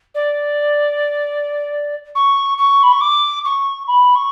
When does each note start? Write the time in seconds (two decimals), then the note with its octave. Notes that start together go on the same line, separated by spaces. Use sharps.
0.14 D5
2.15 C#6
2.58 C#6
2.83 B5
2.92 C#6
3.01 D6
3.45 C#6
3.87 B5
4.15 C#6